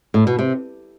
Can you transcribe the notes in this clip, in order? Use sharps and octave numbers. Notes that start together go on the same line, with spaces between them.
A2
B2
C3